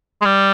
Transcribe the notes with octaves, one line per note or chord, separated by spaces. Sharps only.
G#3
G3